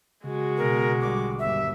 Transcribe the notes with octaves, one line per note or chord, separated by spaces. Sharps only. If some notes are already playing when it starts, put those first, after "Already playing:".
C#3 G#3 F#4
B2 A#4
A#1 D3 G3 D6
G1 D#2 E5